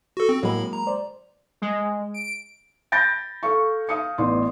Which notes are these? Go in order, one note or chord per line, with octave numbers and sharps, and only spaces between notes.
F#4 A4
C4
A2 F#3 G#3 A#3 B5
A#5
C5 D5
G#3
D7
B5 G6 A6 A#6 D7
A4 F5 C#6
F5 D#6 C#7
A1 B3 D5 C6